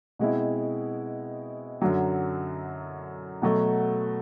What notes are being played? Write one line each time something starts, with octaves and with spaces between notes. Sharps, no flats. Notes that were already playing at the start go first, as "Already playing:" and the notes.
B2 G#3 C4 E4
F#2 D3 F#3
B2 F#3 A3